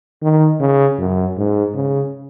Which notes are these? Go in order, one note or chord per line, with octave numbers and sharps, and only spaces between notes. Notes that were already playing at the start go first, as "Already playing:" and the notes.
D#3
C#3
F#2
G#2
C#3